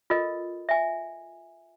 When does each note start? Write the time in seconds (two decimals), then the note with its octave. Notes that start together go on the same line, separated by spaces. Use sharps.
0.10 F4 A4 A#4 D#5
0.69 E5 G#5